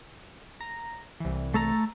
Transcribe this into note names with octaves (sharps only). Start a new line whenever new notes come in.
A#5
C2 E3
A3 A4 A#5